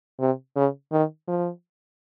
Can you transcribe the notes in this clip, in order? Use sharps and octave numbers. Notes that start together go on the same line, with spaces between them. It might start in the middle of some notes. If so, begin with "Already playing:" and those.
C3
C#3
D#3
F3